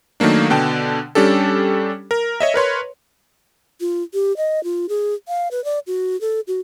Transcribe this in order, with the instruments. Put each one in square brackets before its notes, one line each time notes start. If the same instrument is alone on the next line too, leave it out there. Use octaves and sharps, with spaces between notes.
[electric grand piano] D#3 F#3 A3 A#3 D4
B2 D3 G5 A5
G3 C#4 D4 G4 A4
A#4
C#5 D#5 E5
A#4 B4 C#5 C6
[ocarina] F4
G4
D#5
F4
G#4
F5
B4
D5
F#4
A4
F#4